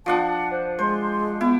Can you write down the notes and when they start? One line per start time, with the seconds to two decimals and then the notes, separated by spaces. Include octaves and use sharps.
0.06 F3 D4 F#5 A5
0.51 C5
0.79 G#3 C5 C6
1.41 B3 E4